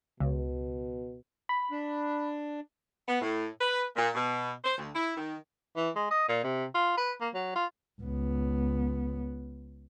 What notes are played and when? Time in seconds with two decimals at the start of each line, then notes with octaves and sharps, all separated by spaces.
0.20 C#2 B2
1.49 B5
1.71 D4
3.08 B3
3.22 A2
3.61 B4
3.96 A#2
4.15 B2
4.65 C5
4.77 D2
4.95 E4
5.17 D#3
5.76 E3
5.96 G#3
6.11 D#5
6.29 A#2
6.44 C3
6.75 F4
6.97 B4
7.21 A#3
7.34 F#3
7.56 F4
8.01 C#2 B3